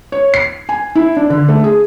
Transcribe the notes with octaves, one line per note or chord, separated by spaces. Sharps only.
C#5
C7
G#5
E4
D4
D3
A3
G#4